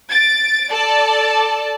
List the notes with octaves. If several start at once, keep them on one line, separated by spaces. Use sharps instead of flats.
A6 D7
A4 D5 A5